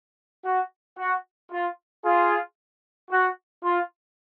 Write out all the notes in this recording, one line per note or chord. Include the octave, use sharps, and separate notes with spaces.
F#4
F#4
F4
F4 G#4
F#4
F4